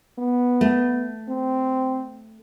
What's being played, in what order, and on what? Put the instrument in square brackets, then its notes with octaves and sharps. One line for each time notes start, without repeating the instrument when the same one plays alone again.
[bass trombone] B3
[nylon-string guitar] A3
[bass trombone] C4